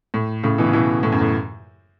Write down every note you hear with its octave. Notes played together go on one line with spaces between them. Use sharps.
A2
A2 C#3
B2 E3
C#3
B2 E3
A2
F#2
A2